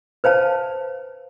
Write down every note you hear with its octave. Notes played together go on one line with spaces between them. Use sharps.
B4 C5 F5 A5